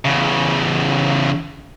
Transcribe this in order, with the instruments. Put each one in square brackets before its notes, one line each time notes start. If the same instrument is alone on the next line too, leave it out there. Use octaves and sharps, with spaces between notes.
[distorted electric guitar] E2 C#3